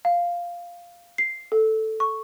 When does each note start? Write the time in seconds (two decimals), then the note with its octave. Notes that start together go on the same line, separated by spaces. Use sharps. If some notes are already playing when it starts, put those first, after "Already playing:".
0.05 F5
1.18 C7
1.52 A4
2.00 C#6